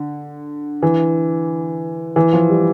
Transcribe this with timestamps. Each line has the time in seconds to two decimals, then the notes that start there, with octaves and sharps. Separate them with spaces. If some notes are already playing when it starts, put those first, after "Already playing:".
Already playing: D3
0.83 E3
2.16 E3
2.33 F3
2.49 G3